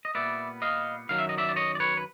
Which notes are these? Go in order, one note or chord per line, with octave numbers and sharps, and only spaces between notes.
D#5
A#2 G3 B3 D5 E5
D#5 F5
F#2 D#3 F#3 F5
E5
D#5
D5 E5
D5
C#5 D#5
D5
B4 C#5
B4